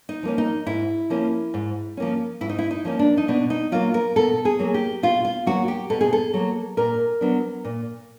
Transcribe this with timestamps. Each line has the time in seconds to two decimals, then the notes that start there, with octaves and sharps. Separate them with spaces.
0.09 D#4
0.23 F3 A#3 C#4
0.38 D#4
0.66 G#2 E4
1.10 F3 A#3 C#4
1.54 G#2
1.97 F3 A#3 C#4
2.41 G#2 E4
2.49 D#4
2.59 E4
2.71 D#4
2.85 F3 A#3 C#4
2.99 D4
3.17 D#4
3.28 B2 D4
3.50 D#4
3.72 F#3 A#3 F4
3.94 A#4
4.16 B2 A4
4.45 G#4
4.59 F#3 A#3
4.74 G4
5.03 B2 F4
5.25 F4
5.46 F#3 A#3 F#4
5.68 G4
5.90 B2 A4
6.01 G#4
6.13 A4
6.34 F#3 A#3
6.77 A#2 A#4
7.21 F#3 B3 D4
7.65 A#2